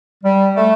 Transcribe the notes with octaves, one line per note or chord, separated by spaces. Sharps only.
G3
A3